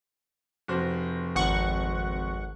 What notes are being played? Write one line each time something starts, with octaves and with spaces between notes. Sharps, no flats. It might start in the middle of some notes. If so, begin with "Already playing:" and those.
F1 F#4 C5
G#1 F#5 C#6